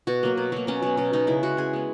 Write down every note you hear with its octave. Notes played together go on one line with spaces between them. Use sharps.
B2 F#4
F#3 A#3
B2
F#3 A#3
B2 C#4
F#3 B3
B2 C#4
F#3 B3 D#4
C#3 E4
G#3 B3 F#4
C#3 G#4
G#3 B3